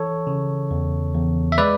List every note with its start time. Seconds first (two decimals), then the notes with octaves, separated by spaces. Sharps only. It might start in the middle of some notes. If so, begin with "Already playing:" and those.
Already playing: E3 A4 C#5
0.27 C#3
0.71 E2
1.14 E2
1.52 E5
1.58 G#3 B4 D5